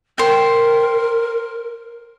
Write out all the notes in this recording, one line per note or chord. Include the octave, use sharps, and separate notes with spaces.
A#4 C5 G5